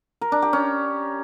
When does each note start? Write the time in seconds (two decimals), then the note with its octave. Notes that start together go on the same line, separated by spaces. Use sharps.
0.21 A#4
0.32 D4
0.42 G4
0.53 C#4